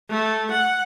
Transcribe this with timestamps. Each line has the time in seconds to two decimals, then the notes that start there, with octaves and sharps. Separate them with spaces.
0.10 A3
0.52 F#5